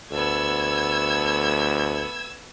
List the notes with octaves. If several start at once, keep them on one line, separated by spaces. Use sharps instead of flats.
D2 A3 B3 E6 G#6